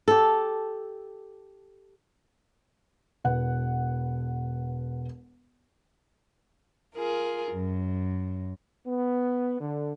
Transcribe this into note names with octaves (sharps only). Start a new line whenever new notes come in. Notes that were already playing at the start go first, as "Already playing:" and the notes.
G4 A4
E1 B4 F#5
F4 G#4 A#4
F#2
B3
D3